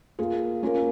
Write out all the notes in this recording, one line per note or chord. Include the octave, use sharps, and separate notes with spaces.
A#3 F4 G#4
A#3 C#4 F4 A#4